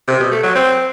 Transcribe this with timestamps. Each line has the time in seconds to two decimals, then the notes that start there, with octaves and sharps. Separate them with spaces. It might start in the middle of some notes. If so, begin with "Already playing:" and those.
0.08 C3
0.20 B2
0.32 A3
0.43 F#3
0.55 C4